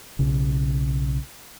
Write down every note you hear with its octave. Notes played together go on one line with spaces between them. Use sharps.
B1 C#3